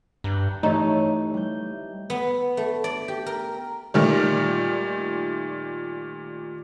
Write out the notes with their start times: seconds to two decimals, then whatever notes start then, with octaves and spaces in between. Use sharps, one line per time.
0.24 G2 A#5 F#6 G6
0.63 E3 A3 D#4 G4 C#5
1.34 G3 G6
2.10 B3
2.57 A3
2.84 D5
3.08 G4
3.26 A#4
3.94 A#2 D#3 G3 A3